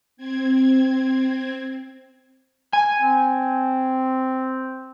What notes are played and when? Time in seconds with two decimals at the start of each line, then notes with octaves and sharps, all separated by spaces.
0.17 C4 G#6
2.73 G#5
3.00 C4